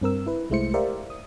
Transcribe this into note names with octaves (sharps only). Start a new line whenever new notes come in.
G2 C4 A#4 E6
E4 B4
C2 G#3 A3 E4 C5 C#7
G4 A#4 C5 D5 E5 F5
D#6